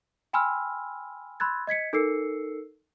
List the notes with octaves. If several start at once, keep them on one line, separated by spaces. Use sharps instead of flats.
G5 G#5 B5 C6 E6 F6
B5 C6 E6 F#6 G#6 A6
D#5 G#6 B6 C#7
D#4 A4 A#4 E6 C7 C#7